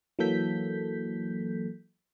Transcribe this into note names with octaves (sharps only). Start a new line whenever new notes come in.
E3 F#3 A#3 A4 G6 B6